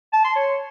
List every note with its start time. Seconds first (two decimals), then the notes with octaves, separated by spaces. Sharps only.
0.13 A5
0.24 C6
0.36 C#5